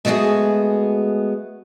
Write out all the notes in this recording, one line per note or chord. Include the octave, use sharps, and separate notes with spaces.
G#3 A3 B3 C#4 F#4 G#4